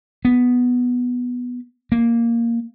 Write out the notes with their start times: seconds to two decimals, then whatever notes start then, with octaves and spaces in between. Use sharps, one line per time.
0.25 B3
1.92 A#3